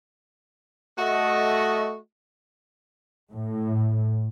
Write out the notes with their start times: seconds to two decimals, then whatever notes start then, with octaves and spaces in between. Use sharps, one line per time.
0.98 A3 F#4 D#5
3.33 A2